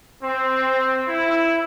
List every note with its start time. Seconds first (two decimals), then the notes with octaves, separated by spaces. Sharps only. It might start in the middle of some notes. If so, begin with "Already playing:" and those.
0.22 C4
1.07 E4